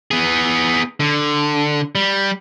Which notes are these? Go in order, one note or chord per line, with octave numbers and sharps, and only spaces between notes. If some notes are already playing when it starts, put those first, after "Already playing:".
B3 G#4
D3
G3